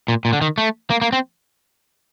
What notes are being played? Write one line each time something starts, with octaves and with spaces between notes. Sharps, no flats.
A#2
A#2
D3
D#3
A3
A#3
A#3
C4